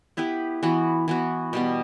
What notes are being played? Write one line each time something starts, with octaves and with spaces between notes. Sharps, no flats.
B3 E4 G4 B4
E3 B3 F#4
E3 B3 F#4
B2 G3 B3